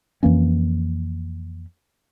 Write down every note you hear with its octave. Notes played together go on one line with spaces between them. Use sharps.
F2 E3 A#3 C#4